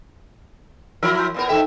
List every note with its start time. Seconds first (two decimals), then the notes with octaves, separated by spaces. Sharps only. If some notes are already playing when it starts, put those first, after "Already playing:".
1.03 F3 E4 A#4
1.18 G#5 C6 G6
1.34 A#2 B3 A#4
1.49 F2 A#3 D#4 A4 E5 G5